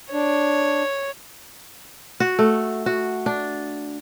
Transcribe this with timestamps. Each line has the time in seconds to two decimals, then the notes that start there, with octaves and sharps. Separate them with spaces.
0.13 D4 C#5
2.20 F#4
2.39 A3
2.86 F#4
3.26 D4